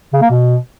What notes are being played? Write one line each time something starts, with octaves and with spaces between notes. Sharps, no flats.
C#3
A#3
B2